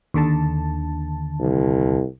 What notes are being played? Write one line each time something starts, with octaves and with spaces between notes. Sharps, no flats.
D#2 D3 A5
C2